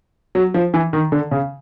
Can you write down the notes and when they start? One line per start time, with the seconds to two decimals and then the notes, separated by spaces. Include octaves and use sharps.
0.35 F#3
0.54 F3
0.74 E3
0.93 D#3
1.12 D3
1.31 C#3